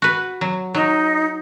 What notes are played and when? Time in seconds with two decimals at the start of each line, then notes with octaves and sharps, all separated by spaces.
0.02 F#4 B4
0.41 F#3
0.75 F#3 D#4